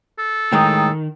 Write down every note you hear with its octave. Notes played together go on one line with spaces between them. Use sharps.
A4
A2 D#3 G#3 G5 A#5 D#6